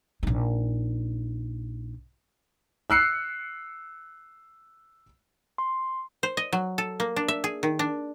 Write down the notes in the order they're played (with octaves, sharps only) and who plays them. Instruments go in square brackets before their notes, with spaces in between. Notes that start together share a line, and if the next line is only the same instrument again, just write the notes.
[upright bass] A#1 D#4
[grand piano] E6 F#6 C7 C#7
[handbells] C6
[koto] C5
D#5
F#3
A4
A#3
D4
E5
G#4
D#3
D4